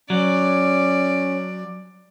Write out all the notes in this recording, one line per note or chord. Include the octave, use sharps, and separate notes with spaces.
F#3 C#4 D5